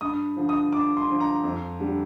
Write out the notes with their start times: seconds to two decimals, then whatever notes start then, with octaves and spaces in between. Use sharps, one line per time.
0.01 G2 D#6
0.37 D3 F3
0.49 D#6
0.72 G2 D6
0.97 C6
1.08 D3 F3
1.20 A#5
1.44 F2
1.79 D3 G3